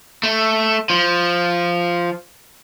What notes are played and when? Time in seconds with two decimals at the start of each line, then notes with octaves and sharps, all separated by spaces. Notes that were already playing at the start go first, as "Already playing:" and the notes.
0.23 A3
0.90 F3